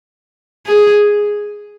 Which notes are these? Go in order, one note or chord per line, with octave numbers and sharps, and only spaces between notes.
G#4